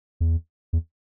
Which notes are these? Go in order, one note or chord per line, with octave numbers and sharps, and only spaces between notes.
E2
E2